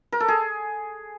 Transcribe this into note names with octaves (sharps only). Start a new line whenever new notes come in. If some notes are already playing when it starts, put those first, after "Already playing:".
A#4
A4
G#4